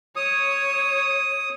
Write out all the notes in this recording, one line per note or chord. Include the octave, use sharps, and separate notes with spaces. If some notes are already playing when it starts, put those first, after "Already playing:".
C#5 D#6